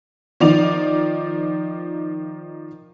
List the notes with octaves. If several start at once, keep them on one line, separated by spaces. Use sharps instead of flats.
D#3 F3 D5 F7